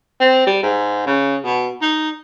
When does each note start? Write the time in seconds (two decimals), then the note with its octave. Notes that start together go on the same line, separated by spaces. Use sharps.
0.21 C4
0.47 G3
0.63 G#2
1.06 C#3
1.44 B2
1.82 D#4